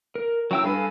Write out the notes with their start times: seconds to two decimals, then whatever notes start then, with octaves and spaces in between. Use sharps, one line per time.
0.15 A#4
0.51 F#3 C#4 E4 G5 E6
0.64 G2 A4 B4 F5 G#5 B5